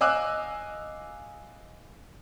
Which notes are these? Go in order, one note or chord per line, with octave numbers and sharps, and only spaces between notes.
D#5 F5 G#5 D6 E6 F#6